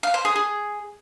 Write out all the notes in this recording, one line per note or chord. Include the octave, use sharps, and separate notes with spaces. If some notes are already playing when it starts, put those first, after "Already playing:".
F5
C5
G#4
G#4